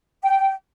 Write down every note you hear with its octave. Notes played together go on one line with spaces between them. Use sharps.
G5